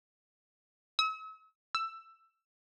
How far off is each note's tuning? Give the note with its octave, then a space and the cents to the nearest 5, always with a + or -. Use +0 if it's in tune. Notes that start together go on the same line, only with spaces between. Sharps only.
E6 -45
E6 +10